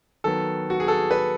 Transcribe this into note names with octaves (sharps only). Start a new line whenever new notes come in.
D#3 F#3 B3 A4
F#4
G#4
A4
B4